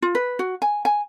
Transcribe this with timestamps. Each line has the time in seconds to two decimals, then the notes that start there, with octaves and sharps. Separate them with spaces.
0.02 F4
0.15 B4
0.39 F#4
0.62 G#5
0.85 G#5